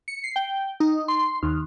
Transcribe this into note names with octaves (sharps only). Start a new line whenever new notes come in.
C#7
C7
G5
D#4
C6
D#2